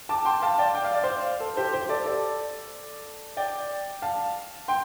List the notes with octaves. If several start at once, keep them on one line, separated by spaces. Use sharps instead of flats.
A5 D6
G5 C6
F5 A5
D5 G5
G5
F5
D5
C5 F5
A4
G4 C5
G4 C5
A4 D5
A4 D5
D5 G5
F5 A5
G5 C6